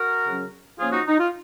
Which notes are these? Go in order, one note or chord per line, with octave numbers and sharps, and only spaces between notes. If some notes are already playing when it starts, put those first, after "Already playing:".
Already playing: F#4 A#4
C#3 F#3 C#4
F3 A#3 C#4 F4 G#4
D#4 F#4
D#4
F4